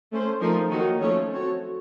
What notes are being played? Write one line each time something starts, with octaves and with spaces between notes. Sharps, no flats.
A3 C#4 A4 C5
F3 A3 D#4 A#4
D#3 F#3 A#3 D#4 F#4
F3 A3 C#4 A4 C#5
C4 F#4 A4 C#5